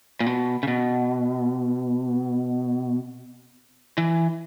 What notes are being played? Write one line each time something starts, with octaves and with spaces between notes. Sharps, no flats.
A#2
B2
C#3
B2
E3